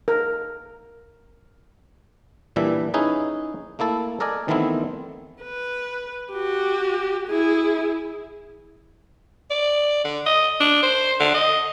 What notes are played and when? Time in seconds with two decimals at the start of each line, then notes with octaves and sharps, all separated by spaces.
0.08 A#4
2.56 A#2 E3 G3 D4 E5
2.94 C#4 D#4 E4 G#4 B4
3.79 A3 A#3 E4 A4
4.20 A4 A#4 D5 D#5 G#5
4.48 D#3 E3 A3 B3 C4 E4
5.43 B4
6.32 F#4 G4
7.27 E4 G#4
9.51 D5
10.04 D3
10.26 D#5
10.60 D4
10.83 C5
11.20 D3
11.34 D#5